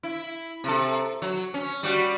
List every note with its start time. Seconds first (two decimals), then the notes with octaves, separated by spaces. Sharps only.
0.03 E4
0.64 C3 A4
1.22 F#3
1.54 C#4
1.83 G3 F#4